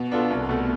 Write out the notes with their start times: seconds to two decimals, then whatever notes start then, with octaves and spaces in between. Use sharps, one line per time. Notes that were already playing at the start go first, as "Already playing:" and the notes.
Already playing: B2
0.11 B3 D4 F4 A4
0.30 C2
0.49 B2 A3